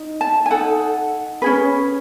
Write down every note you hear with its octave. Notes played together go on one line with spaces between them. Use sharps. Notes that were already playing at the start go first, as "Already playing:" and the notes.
Already playing: D#4
A5
G#5
D#4 A4 F#5
C#4 G#4 B4